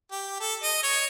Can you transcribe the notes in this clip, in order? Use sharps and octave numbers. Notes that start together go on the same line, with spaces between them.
G4
A4
D#5
C#5